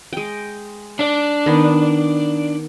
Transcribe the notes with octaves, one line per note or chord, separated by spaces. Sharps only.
G#3 G5
D4 D5
D#3 B3